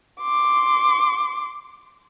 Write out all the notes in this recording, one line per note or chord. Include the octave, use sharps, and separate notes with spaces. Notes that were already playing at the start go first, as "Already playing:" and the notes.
C6 D6